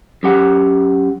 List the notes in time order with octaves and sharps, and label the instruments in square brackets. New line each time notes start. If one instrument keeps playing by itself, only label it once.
[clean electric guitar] F#2 G4 F#5